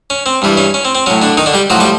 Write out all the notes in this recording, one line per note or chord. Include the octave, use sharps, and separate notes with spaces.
C#4
C4
G2 E3 G3
C#4
C#4
C4
C4
A2 F#3 C#4
D3 D4
D#3 D#4
D3 D4
G3 G4
A2 F3 F#3 F#4
G3 G4